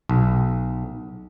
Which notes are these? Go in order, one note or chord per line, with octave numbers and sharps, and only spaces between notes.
B1